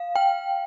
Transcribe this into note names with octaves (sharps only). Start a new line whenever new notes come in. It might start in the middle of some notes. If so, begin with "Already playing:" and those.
Already playing: F5
G5